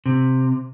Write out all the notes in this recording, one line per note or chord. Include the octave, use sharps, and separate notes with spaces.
C3